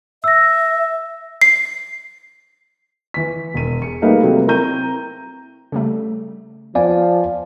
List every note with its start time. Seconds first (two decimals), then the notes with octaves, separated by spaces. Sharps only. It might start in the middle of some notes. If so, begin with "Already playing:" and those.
0.24 E5 E6 A#6
1.41 C7
3.14 E3 B6
3.54 E1 D#7
3.82 G#4 C#7
4.02 G3 A3 A#3 D#4 B4 F5
4.22 C3 F#3 A3 A#3
4.47 C4 E4 A#4 A#5 G6 D#7
5.72 C#3 G3 A3
6.75 F3 B3 D5 F5 G#5